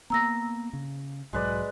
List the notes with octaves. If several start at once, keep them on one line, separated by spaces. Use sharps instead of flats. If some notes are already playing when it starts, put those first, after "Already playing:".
A#3 B3 A#5 E6 A#6
C#3
B1 G#2 F#3 G#3 B4 D5